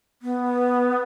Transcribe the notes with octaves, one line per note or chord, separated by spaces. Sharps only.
B3